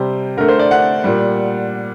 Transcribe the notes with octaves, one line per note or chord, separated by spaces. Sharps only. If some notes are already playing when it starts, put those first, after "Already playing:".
Already playing: C3 G3 C5
D3 A3 A#4
C5
D5
F#5
A#2 G3